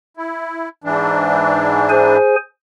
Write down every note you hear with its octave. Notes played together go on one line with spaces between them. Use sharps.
E4
G#2 E3 D4
G#4 C5 G#5